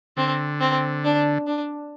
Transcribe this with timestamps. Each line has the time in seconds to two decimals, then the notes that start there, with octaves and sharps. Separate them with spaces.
0.17 D3 C4
0.60 C4
1.04 D4
1.47 D4